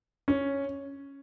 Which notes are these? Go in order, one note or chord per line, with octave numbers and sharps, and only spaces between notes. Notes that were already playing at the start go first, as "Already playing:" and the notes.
C#4